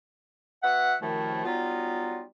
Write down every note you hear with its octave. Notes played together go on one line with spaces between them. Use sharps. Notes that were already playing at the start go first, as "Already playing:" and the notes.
B3 F#4 E5 F#5
F#2 C3 D#3 F3 A3 E4
F#3 G3 B3 D#4 F4